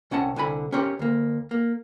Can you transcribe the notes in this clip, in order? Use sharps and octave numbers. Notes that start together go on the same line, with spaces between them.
C2 C#4 F#5 A5
C2 D3 G#5 B5
C#4 G4 A#4 C5 C#5
D2 A#3
A#3